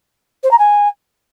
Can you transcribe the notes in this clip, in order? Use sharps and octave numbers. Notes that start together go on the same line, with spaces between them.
C5
A#5
G#5